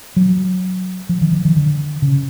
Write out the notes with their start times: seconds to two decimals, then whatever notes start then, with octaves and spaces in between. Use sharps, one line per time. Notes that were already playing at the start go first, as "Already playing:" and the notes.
0.16 F#3
1.09 F3
1.21 D#3
1.33 F3
1.45 D#3
1.56 D3
2.02 C#3